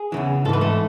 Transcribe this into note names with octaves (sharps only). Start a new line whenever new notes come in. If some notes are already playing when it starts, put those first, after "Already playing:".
Already playing: G#4
E2 C#3 E3
G#2 E3 A4 B4
A3 A4